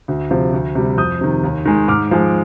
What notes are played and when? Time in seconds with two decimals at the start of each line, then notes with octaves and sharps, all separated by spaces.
0.08 D2
0.31 C3 F3
0.53 D2
0.75 C3 G3
0.98 F2 D#6 G6
1.21 C3 D#3
1.43 D#2
1.65 D#3 G#3
1.88 G#2 D6 F6
2.11 F3 G#3